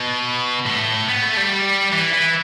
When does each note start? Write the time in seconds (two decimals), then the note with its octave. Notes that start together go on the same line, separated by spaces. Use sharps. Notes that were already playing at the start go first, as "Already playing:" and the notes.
Already playing: B2
0.66 A2
1.09 B3
1.22 A3
1.37 G3
1.93 E3
2.14 E3